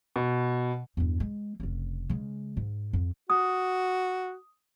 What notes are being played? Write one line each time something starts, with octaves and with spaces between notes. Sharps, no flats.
B2
E2 G2
G#3
F1 C#3
C#3 G#3
G#2
F2
F#4 D#6